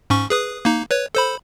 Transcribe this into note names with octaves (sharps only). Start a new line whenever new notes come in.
G#2 C#4 C#6
G#4 B4 D#6
A#3 D#4
B4 C#5
A4 C5 B5